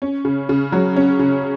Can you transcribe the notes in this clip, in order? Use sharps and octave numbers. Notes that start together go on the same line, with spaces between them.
C#4
C#3
C#3
F#3
C#4
C#3